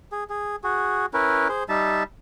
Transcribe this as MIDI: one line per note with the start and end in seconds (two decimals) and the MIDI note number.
0.12 0.24 68
0.30 0.56 68
0.64 1.06 66
0.64 1.06 68
1.14 1.48 61
1.14 1.48 64
1.14 1.48 70
1.14 1.48 71
1.49 1.64 68
1.49 1.64 72
1.69 2.03 55
1.69 2.03 63
1.69 2.03 76
1.69 2.03 81